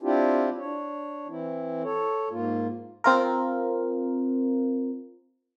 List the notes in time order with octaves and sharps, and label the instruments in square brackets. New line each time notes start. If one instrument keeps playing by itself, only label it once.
[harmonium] C4 D4 E4 F4 G4
D4 C#5
E3 C4 E4
A4 C#5
G#2 A#3 F4
[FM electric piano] C4 F4 A#4